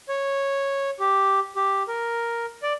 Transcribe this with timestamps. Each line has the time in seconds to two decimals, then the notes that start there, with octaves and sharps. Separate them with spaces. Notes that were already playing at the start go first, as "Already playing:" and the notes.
0.09 C#5
1.00 G4
1.56 G4
1.88 A#4
2.63 D5